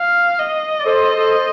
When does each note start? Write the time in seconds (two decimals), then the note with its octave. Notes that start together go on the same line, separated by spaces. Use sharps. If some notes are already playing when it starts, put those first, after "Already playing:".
Already playing: F5
0.40 D#5
0.79 D5
0.85 A4 C5
1.15 A4 C5
1.37 A4